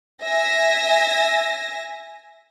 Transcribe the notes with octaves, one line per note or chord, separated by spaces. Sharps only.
E5 G#5 A#6